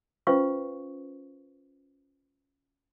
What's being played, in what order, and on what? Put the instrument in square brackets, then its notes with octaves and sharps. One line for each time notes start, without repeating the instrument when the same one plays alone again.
[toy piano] C#4 F4 B4 C5 F5 C#6